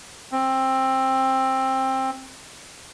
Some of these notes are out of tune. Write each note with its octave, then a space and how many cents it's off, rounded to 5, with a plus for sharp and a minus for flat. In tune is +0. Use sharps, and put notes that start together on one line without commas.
C4 +15